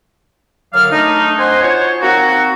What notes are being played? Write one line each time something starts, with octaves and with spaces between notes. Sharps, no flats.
F#2 D3 F#3 D5 F5 F6
A3 D4 D#4
C4 C5 D#5 F#5 G#5 C6
F#3 F4 C5 C#5
A#3 C4 D#4 F#4